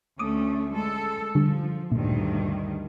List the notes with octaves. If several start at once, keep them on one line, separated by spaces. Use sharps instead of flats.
D2 A3 C#4 D6 D#6
G#3 A4
D3 F3 G3
D2 G2 A#2 D#3